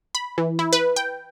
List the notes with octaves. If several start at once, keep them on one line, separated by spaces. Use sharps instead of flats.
B5
E3
E4
B4
G5